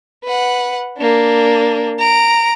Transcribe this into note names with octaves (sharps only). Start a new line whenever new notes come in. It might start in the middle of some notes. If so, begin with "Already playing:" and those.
B4 F#5
A#3 D4
A#5 D7